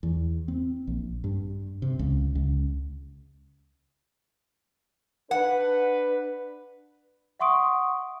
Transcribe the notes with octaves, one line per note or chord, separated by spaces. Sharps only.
E2
C4
A#1
G2
C3
C#2
C#2
D4 B4 F#5
E5 F#5 C6 C#6 D#6 D7